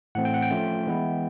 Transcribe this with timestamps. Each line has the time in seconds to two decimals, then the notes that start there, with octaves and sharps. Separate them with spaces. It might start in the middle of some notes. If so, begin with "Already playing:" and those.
0.15 A2 E3 A3 C4 F#5
0.25 G5
0.34 F#5
0.42 G5
0.51 F3 A3 C#4 F4
0.87 E3 G#3 B3 E4